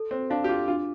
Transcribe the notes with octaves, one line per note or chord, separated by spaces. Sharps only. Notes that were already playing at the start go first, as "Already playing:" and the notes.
Already playing: A4
C4 C5
D4 F5
G4
F4 D6
D4 F4